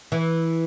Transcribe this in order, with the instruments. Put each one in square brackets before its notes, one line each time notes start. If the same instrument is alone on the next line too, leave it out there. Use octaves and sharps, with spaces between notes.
[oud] E3